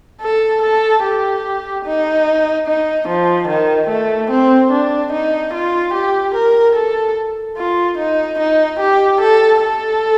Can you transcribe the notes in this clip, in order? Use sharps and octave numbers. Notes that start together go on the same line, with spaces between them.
A4
A4
G4
D#4
D#4
F3
D#3
A3
C4
D4
D#4
F4
G4
A#4
A4
F4
D#4
D#4
G4
A4
A4